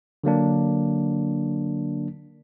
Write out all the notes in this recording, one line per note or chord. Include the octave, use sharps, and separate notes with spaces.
D3 F#3 A#3 D4